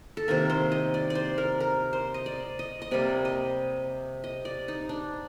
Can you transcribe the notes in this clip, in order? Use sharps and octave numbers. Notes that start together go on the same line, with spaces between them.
A4
C3 D#3 A#3 A#4
C5
D#5
D5
D5
C5
A#4
A#4
C5
D#5
D5
D#5
D#5
C3 G3 A#3 D5
D#5
D#5
D5
D#4
D4